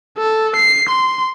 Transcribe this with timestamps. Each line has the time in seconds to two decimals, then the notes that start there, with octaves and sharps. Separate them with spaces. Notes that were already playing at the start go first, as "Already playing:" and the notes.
0.18 A4
0.57 C7
0.89 C6